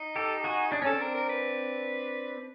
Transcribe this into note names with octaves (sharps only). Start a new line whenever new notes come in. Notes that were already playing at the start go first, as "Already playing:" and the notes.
Already playing: D#4
G4 A4
F#4 G#4
D4 G#4
C#4 A4
C4 D4
A#4
A#4
B4